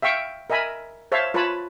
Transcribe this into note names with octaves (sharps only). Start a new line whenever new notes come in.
E5 F5 G5 C#6
A#4 D#5 E5 G#5 B5
C5 C#5 E5 F5 A5
F4 B4 C#5 A5 B5